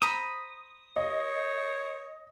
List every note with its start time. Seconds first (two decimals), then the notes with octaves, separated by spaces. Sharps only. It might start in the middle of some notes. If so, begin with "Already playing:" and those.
0.02 C5 A#5 B5 D#6
0.96 C#5 D#5